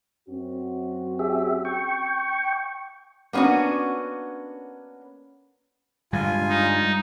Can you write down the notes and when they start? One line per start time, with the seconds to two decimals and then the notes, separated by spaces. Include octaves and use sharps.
0.29 F#2 C4 F#4
1.19 G4 G#4 E5
1.65 G5 C#6
3.33 A#3 B3 C#4 D4 F#4
6.13 G2 D3 G3 G#3 F4 G#5
6.49 D#4